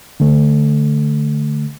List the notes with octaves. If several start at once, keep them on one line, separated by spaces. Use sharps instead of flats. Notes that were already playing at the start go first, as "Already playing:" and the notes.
D3 A3